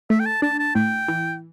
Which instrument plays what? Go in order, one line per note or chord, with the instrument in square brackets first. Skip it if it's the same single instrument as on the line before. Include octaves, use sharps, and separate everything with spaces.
[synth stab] A3 [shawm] E5
[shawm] G5
A5
[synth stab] D4 [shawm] A5
[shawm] A5
[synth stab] A2 [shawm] G5
[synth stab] E3